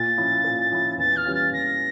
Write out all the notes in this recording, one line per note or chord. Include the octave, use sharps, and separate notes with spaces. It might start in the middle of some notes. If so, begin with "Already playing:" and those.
Already playing: A#2 A6
F3 C#4 E4
A#2
F3 C#4 E4
E2 A6
F6
E3 G3 C#4 F4
A6
E2 A#6